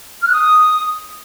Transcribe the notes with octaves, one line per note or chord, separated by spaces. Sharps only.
F6
F#6
D#6